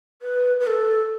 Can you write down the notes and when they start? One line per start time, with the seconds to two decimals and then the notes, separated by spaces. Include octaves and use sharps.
0.22 B4
0.60 B4
0.67 A4